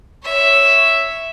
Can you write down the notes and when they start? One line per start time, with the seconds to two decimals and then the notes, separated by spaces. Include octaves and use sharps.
0.23 C#5 E5